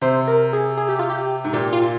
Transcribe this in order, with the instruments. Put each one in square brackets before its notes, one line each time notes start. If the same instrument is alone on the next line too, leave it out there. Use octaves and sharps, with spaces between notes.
[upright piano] C3 [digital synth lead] C5
[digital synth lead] A#4
G#4
G#4
G4
F4
G4
[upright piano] G#2
[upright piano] A#2 [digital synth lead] G4
[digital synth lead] F4